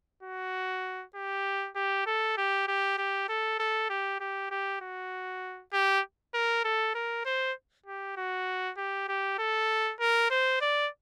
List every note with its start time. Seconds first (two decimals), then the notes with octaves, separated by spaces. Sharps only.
0.23 F#4
1.15 G4
1.76 G4
2.07 A4
2.38 G4
2.68 G4
2.98 G4
3.29 A4
3.59 A4
3.90 G4
4.20 G4
4.51 G4
4.81 F#4
5.73 G4
6.34 A#4
6.65 A4
6.95 A#4
7.25 C5
7.86 G4
8.17 F#4
8.77 G4
9.08 G4
9.39 A4
10.00 A#4
10.31 C5
10.61 D5